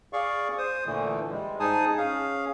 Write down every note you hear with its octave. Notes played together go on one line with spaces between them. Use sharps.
G#4 D5 F5 C#6
C5 D#6
A#2 D3 E3 A3
G3 G#3
G#2 D#4 G#4 G#5 A5 D#6
C#4 G#4 F5